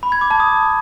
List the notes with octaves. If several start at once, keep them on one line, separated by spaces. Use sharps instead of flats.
B5
G#6
D6
A5
D#6